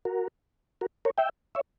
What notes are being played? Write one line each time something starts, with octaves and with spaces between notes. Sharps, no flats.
F#4 A#4
F#4 A#4
A#4 C#5
E5 G5
C#5 E5